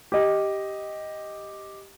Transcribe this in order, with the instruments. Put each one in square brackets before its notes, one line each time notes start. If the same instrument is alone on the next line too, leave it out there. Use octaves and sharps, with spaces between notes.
[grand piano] G4 D#5